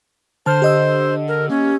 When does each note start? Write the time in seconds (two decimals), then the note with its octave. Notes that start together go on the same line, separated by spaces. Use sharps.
0.46 D3 C5 A5 F6
0.62 G4 D#5 E6
1.28 A#4
1.49 A#3 C#4